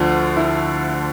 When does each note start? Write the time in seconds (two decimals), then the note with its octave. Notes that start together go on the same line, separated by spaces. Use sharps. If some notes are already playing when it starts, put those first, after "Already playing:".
Already playing: D2 D3 F3
0.37 E4